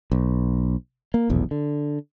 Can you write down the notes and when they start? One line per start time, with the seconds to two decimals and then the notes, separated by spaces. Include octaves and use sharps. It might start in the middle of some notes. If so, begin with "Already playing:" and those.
0.12 B1
1.14 A#3
1.30 F1 B1 E2
1.51 D3